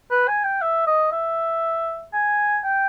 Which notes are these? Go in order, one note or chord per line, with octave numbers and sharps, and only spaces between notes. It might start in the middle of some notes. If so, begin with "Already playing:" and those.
B4
G#5
G5
E5
D#5
E5
G#5
G5